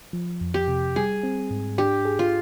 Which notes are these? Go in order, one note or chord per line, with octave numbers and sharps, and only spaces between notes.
F3
F2
G4
C3
G3 G#4
C4
G#2
D4 G4
G#4
F4